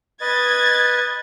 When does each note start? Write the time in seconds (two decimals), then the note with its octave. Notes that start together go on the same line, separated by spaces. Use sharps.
0.21 B4 D#5 G#6 A6